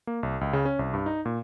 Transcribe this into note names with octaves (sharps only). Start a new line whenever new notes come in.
A#3
C2
C#2
C#3
C#4
C2
G2
D#4
A#2